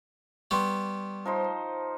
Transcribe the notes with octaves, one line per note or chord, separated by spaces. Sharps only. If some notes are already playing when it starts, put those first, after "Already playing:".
G3 B3 C6 C#6
F3 D#4 C5